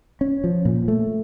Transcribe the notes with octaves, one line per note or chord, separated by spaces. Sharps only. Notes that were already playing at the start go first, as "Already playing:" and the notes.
C#4
F3
A#2
A3